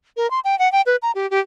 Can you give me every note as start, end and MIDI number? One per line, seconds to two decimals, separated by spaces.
0.17 0.29 70
0.31 0.40 84
0.45 0.58 79
0.59 0.70 78
0.72 0.82 79
0.86 0.96 71
1.02 1.12 82
1.15 1.29 67
1.31 1.40 67